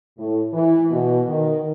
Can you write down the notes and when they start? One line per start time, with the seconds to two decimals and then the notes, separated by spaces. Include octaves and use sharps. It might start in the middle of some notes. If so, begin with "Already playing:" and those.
0.18 A2
0.54 E3
0.91 B2
1.29 D#3